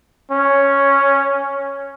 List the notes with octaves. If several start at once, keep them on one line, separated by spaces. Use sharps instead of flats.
C#4